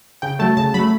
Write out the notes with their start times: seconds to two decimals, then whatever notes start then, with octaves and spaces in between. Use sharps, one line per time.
0.22 C#3 G5
0.39 F#3 A3 A5
0.57 C#3 A5
0.74 F#3 B5
0.79 A3